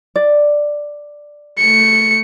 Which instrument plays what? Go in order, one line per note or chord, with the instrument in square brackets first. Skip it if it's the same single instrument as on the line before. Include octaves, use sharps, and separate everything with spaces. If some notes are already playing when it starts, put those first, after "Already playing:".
[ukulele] D5
[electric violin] A3 C#7